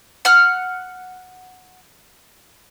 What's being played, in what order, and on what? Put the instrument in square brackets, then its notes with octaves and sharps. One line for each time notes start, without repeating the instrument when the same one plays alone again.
[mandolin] F#5 F6